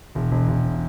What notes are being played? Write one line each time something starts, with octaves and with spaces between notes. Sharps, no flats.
E1
E1
E1